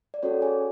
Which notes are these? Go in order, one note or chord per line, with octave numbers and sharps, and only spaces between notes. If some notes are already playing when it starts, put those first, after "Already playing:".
D5
C#4 F#4 A4 C#5
G#4 G#5